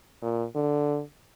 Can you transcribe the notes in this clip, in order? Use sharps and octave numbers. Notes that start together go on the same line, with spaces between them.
A#2
D3